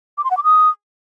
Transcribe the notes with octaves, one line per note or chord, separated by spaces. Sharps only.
D6
C6
F#5
D6
D#6